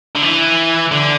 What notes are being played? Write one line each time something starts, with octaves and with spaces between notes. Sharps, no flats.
D3
E3
D3